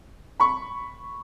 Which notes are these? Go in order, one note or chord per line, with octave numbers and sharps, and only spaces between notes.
B5 C#6